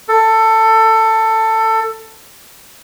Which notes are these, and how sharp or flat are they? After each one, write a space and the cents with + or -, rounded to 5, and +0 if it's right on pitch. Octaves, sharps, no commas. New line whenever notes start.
A4 +15